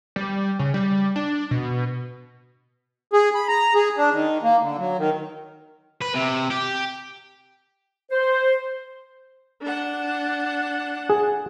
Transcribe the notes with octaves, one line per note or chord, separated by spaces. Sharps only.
G3
C#3
G3
D4
B2
G#4
B5
A#5
G#4
D4
D#3
A#3
D3
F#3
D#3
B4
C3
G4
C5
D4 F#5
G#4